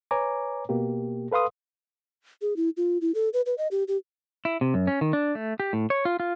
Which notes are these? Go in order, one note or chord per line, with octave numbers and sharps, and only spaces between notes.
B4 C#5 G#5 A#5 D6
B2 A#3 G4
A4 B4 F5 C6 D#6
G#4
E4
F4
E4
A4
B4
B4
D#5
G4
G4
E4
C3
F#2
C#4
D#3
D4
A3
G4
A2
C#5
F4
F4